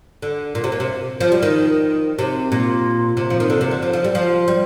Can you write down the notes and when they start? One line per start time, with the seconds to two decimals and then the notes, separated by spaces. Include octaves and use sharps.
0.22 D3
0.55 A#2
0.64 C3
0.72 A#2
0.80 C3
1.21 F3
1.32 G3
1.43 D#3
2.19 C3
2.52 A#2
3.17 C3
3.30 F3
3.40 D#3
3.50 D3
3.61 C3
3.71 D3
3.82 F3
3.93 F3
4.04 G3
4.15 F3
4.48 G3